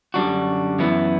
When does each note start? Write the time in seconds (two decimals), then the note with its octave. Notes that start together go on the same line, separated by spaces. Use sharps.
0.14 F#2 D3 G3 D4 F#4
0.79 F#2 E3 B3 E4